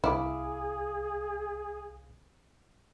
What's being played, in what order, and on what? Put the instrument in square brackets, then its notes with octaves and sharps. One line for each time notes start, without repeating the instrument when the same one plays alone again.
[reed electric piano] C2 F5 D6 [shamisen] E4 [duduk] G#4